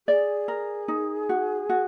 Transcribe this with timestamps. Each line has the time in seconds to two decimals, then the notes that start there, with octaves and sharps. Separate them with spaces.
0.08 G#4 D5
0.48 A#4
0.88 D#4
1.29 F#4
1.69 F#4